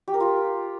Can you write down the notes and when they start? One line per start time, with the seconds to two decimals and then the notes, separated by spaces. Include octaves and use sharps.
0.08 G4
0.14 A#4
0.20 F4